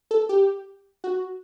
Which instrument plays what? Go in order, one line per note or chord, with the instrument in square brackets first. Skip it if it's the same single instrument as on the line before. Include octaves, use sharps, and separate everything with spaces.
[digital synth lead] A4
G4
F#4